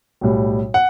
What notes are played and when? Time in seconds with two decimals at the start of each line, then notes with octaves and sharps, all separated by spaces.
0.21 B1 A2 G3
0.74 F#5